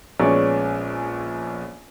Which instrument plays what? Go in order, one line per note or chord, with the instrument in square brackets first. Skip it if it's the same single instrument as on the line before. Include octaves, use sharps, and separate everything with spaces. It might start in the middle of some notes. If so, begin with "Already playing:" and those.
[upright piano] A#1 G#3 B3 C#4 C#5 D5